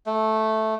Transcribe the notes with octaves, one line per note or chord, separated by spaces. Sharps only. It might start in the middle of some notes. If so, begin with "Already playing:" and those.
A3